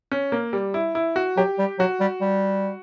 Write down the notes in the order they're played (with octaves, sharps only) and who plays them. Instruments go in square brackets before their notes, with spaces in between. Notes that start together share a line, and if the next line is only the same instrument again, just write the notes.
[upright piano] C#4
A#3
G3
E4
E4
F#4
[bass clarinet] F#3 [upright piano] G4
[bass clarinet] G3
[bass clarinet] F#3 [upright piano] F#4
[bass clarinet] G3
G3